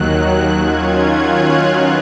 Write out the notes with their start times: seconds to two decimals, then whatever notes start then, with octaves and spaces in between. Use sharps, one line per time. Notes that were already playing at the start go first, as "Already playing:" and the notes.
Already playing: D#2 D#3 F#3 F#6
0.52 D#3 F#3 C#4 F4 G#6
1.10 F#6
1.40 F6
1.68 D#3 F#3 B3 F4 F#6